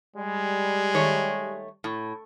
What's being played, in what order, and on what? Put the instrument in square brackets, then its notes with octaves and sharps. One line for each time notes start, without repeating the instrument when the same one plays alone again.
[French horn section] G3 [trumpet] G#3
[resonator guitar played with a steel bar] D#3 A3 C#5
A2